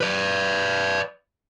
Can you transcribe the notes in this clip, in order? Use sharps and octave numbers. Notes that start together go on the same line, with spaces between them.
B4 D5